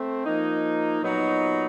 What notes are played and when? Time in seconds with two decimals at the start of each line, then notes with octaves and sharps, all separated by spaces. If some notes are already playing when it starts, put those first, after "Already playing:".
Already playing: A3 C4
0.25 F3 A#3 D#4
1.02 A#2 F#3 B3 D#4 F#4